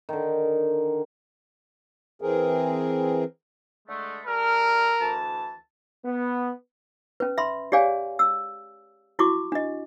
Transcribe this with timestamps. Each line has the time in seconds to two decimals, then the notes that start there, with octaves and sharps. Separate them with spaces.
0.09 D3 D#3
2.21 E3 C4 G#4 A#4
3.88 D3 G#3 A3
4.26 G3 A4 A#4 F6
5.01 D2 E3 A5
6.05 B3
7.20 C#4 B4
7.38 E5 B5 C6
7.72 G4 G#4 C#5 D5 F5 G#5
8.19 E6
9.19 E4 F#4 C#6 D6
9.52 D4 D#5